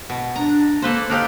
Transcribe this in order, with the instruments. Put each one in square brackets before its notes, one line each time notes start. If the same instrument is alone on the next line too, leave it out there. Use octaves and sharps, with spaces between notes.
[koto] B2
[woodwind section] D4 [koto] A#5
[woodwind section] A#3 [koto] A4 B4 C5
[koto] D4 D#4 G4 [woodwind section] A4 F5 F6